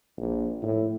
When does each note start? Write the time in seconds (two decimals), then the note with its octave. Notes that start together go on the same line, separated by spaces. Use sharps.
0.18 A#1
0.63 A2